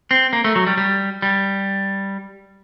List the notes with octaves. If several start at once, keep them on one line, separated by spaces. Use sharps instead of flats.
C4
A#3
A3
F#3
G3
G3
G3